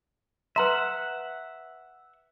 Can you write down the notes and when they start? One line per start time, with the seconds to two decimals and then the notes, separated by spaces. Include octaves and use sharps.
0.56 B4 E5 F#5 A#5 C6